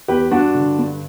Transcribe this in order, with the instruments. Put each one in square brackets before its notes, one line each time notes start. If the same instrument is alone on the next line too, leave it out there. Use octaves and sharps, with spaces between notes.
[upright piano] E2 G4 B4
G2 D4 F#4
D3
G2